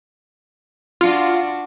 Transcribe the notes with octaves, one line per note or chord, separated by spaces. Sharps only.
D4 F4 F#4